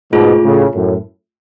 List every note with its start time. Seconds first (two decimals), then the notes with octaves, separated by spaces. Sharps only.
0.12 G#2 B2 A3 F4 G#4
0.43 A2 C#3
0.74 F#2 A2